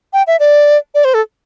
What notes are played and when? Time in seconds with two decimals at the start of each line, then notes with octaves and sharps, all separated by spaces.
0.13 G5
0.27 E5
0.40 D5
0.95 D5
1.05 C5
1.14 A4